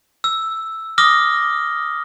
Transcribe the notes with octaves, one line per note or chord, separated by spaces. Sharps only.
E6
D6 D#6 F6 A#6 G7